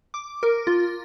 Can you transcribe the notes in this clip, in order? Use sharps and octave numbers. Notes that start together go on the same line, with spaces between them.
D6
A#4
F4